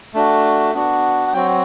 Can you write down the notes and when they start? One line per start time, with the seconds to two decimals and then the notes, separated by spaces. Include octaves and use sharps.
0.14 A3 D4 F#4
0.74 B3 D4 F#4
1.27 F#5
1.33 F#3 C4 F#4 G5